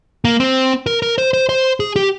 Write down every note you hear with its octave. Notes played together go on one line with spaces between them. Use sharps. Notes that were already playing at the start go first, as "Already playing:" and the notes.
A#3
C4
A#4
A#4
C5
C5
C5
G#4
G4